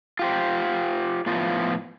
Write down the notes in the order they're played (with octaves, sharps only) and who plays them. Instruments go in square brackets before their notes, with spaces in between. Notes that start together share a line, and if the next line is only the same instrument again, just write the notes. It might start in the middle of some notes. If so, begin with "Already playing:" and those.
[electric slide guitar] F4 G4 C5
A2 F3 B3 F4